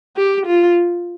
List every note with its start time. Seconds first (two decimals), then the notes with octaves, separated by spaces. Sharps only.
0.17 G4
0.46 F4